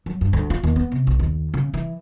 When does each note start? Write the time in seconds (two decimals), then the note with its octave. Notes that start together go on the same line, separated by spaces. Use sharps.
0.06 F#3
0.21 G2
0.33 D2
0.50 F4
0.64 D#2
0.76 B3
0.92 C3
1.07 B1
1.19 D#2
1.54 C#3
1.74 E3